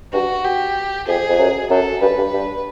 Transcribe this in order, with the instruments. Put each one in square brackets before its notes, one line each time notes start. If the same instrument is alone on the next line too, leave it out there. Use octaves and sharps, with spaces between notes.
[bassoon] G2 [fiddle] F#4
[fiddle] G4
[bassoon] F2 [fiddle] G#4
[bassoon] F2
F#2
[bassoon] F#2 [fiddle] A4
[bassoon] G2 [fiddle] B4
[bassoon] G2
G2